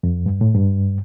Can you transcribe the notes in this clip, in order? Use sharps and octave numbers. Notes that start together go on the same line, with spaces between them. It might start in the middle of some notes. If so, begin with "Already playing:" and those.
F2
G2
A2
G2